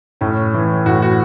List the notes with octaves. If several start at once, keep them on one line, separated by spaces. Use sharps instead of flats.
A2 C#4
E3
A2 F#4
F#4